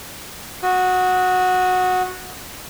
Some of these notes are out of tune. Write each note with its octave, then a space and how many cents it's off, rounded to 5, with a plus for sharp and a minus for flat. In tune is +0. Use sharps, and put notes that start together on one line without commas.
F#4 -10 D#6 +20